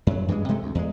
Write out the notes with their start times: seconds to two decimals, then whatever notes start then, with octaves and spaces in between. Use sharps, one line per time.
0.07 F#2 F#3
0.28 G2 E3 F#3 G#3
0.48 C3 G#3 A3
0.63 D2
0.75 E2 G#3